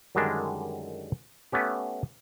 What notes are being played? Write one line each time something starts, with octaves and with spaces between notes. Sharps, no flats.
F#2 D3 D#3 G3 G#3 D4
A3 B3 C#4 G4